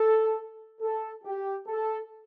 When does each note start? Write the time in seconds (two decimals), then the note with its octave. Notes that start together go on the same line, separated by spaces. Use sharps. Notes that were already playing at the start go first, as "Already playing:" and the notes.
Already playing: A4
0.81 A4
1.24 G4
1.67 A4